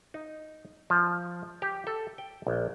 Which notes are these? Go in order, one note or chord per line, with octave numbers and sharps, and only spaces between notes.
D#4
F3
G4
A4
G5
A#1